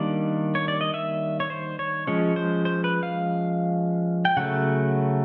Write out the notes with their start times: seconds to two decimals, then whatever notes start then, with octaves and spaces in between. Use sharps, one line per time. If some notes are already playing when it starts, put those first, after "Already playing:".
Already playing: D#3 G3 A#3 D4 D5
0.55 C#5
0.68 D5
0.81 D#5
0.94 E5
1.40 C#5
1.50 C5
1.79 C#5
2.07 F3 G#3 C#4 C#5
2.36 C5
2.65 C5
2.84 B4
3.03 F5
4.25 G5
4.37 C#3 F#3 A3 F#5